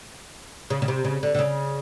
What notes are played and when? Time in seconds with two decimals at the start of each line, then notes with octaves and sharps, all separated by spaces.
0.70 C#3
0.82 C#3
0.88 C3
1.05 C#3
1.23 D3
1.35 D3
1.39 C#3